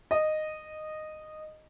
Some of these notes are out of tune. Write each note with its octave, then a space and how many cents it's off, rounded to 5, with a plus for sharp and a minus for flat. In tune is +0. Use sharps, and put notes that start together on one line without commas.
D#5 -10